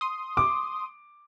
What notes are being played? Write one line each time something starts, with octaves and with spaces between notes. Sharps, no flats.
C6 D#6
D6